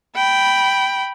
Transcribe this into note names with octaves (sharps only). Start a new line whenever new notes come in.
G5 B5